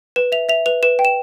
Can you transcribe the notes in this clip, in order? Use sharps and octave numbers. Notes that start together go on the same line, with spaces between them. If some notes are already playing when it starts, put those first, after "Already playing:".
B4 E7
E5 F7
E5 F7
B4 F7
B4 E7
G5
E7